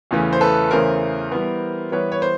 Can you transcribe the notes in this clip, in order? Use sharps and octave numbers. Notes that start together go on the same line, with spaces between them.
E2 C#3 E3 A3 C#4
C5
A4 B4
E2 C#3 E3 A3 C#4 A#4 C5
E3 G3 B3
E3 G3 B3 B4 C#5
C#5
C5